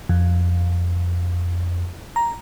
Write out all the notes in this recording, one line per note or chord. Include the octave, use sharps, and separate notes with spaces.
F2
A#5